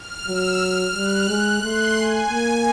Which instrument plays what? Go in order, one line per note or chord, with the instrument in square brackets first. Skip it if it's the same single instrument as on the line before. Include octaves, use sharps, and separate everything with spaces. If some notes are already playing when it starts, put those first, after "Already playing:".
Already playing: [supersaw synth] F6
[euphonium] F#3 [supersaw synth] E6
[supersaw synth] F6
[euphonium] G3 [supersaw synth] F#6
[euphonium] G#3
[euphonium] A3 [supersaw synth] C6
[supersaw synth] G#5
[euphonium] A#3